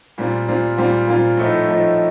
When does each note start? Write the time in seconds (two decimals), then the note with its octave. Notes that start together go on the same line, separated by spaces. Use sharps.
0.18 A#2 G3 C4 F4
0.48 A#2 G3 C4 F4
0.78 A#2 G3 C4 F4
1.08 A#2 G3 C4 F4
1.37 A2 F3 A3 D#4
1.67 A2 F3 A3 D#4